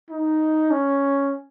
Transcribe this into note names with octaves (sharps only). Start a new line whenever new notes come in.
D#4
C#4